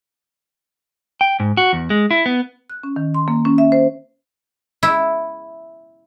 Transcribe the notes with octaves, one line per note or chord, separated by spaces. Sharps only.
G5
G#2
F#4
E2
G#3
E4
B3
F#6
C#4
D#3
C6
A#3
C#4
E5
C5
E4